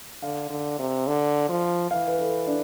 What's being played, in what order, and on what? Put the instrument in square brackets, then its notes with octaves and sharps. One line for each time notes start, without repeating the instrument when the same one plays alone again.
[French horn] D3 [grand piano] F5
[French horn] D3
C3
D3
F3
[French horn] E3 [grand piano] F5
[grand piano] B4
A4
D4